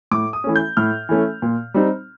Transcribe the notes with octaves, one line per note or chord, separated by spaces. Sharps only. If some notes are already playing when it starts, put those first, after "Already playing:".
A2 D6
D#6
E3 A3 C#4
G6
A2 F6
E3 A3 C#4
A#2
G3 C4 D#4